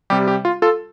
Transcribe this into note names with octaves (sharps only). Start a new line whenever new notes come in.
C3 G3 G4
G4
F4
F4 A4